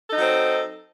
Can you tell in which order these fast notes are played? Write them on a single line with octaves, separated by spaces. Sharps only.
A4 D#4 F#3 C4